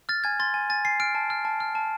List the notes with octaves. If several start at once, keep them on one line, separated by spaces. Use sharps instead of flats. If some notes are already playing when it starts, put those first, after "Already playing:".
F6 A6
G#5 G#6
C6 A6
G#5
G#5 A6
G#5 C7
F6 D7
A5
F6
A5
F6
A5